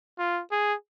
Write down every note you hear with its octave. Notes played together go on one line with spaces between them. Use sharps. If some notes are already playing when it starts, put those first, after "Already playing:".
F4
G#4